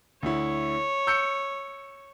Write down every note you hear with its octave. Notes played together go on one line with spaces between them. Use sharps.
D2 E4 C#5
E6 G6 C#7